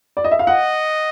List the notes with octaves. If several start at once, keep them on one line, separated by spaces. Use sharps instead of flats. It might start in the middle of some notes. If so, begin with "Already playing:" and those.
D5
D#5
E5
F5
D#5 F#5